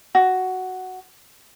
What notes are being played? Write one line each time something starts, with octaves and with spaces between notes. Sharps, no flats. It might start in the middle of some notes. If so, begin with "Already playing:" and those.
F#4